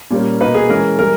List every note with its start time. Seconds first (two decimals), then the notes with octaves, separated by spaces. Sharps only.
0.11 A#2 G3 A#3 C#4
0.40 B2 A#3 D#4 B4
0.55 G#4
0.69 E3 G#3 C#4 A#4
0.99 E3 G3 A#4